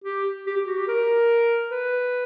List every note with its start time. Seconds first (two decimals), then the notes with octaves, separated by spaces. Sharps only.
0.04 G4
0.47 G4
0.57 G4
0.67 F#4
0.77 G4
0.88 A#4
1.71 B4